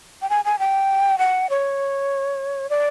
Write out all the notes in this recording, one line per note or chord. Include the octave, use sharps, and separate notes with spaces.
G5
G#5
G#5
G5
F#5
C#5
D5